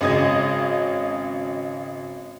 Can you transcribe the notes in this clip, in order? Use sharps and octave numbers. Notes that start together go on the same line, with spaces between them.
G#1 C#3 D#5 D#6 G#6